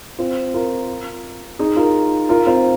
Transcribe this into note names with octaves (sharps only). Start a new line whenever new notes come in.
C4 F4
F4 A#4
D#4 G#4
F4 A#4
F4 A#4
C4 F4